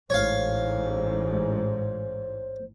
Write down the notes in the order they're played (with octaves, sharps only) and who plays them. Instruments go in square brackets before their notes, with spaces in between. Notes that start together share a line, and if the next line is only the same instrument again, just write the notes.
[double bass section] A1 G#2 [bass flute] C5 [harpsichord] C#5 F5